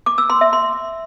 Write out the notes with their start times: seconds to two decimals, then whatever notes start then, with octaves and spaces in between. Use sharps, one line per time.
0.06 D6
0.18 E6
0.30 C6
0.41 E5
0.53 C6